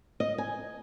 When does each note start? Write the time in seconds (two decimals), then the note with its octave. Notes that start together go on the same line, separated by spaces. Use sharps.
0.20 D#5
0.38 G#5